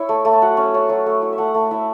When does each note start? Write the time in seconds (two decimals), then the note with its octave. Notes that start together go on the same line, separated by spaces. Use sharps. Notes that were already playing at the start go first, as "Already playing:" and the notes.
Already playing: E4 C#5
0.09 A3
0.25 A3
0.33 A5
0.42 F#3 F#5
0.57 C#4
0.74 C#4 A5
0.89 F#3
1.06 A3
1.22 E4
1.33 E5
1.38 A3 F#5
1.54 A3
1.71 E4 E5